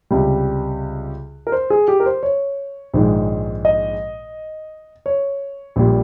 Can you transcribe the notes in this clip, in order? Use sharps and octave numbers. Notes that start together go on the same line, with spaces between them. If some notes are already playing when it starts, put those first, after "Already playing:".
C#2 C3 G3
A#4
C5
G#4
G4
A#4
C5
C#5
A#1 G#2 D#3 G#3
D#5
C#5
A#1 A#2 G3